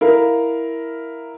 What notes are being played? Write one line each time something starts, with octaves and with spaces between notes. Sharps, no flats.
E4 A#4 F5